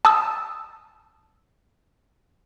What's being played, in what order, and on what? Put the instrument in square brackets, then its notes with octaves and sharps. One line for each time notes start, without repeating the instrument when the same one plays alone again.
[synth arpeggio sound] A5 D#6 E6